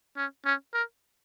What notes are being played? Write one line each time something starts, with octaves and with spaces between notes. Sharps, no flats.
C#4
C#4
A#4